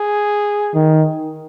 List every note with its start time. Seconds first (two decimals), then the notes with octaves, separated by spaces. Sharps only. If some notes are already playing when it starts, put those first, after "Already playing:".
Already playing: G#4
0.75 D#3